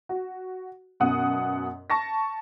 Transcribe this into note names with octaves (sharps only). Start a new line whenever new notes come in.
F#4
F#2 B2 F#5 D#6
A5 C#6 A#6